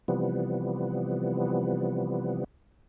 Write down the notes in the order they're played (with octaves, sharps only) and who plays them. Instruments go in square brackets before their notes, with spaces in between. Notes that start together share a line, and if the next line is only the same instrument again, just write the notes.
[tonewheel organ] C3 E3 F3 G3 B3